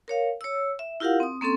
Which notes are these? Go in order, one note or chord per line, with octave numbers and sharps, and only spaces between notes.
A#4 C#5 F5
C#5 E6
E5
E4 F4 G4 A#4 F5 F#5
C4 D#6
A#3 C4 C#4 A4 C6